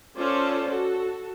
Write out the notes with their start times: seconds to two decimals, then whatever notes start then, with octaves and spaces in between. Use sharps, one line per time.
0.18 C#4 F4 A4 C5 D5
0.69 F#4 A4